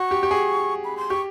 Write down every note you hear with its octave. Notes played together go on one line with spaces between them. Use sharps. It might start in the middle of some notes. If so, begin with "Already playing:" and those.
Already playing: F#4 C#6
G4
G4
G#4
B5
C6
G4 C#6